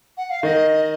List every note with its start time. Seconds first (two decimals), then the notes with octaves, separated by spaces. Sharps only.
0.17 F#5
0.30 F5
0.43 D#3 D#5